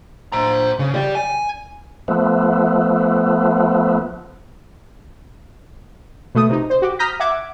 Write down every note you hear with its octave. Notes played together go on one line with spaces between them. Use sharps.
C5 A#5
C#3
G4 D5
G#5
F3 A3 B3
B2 A3 D#6
C3 D#4
C5
F#4 G4
A#5 D#6 F6 G6 A#6 B6
E5 F#5 D6 G#6